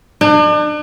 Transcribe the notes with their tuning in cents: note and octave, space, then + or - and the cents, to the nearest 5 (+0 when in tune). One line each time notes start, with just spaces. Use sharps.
D4 +40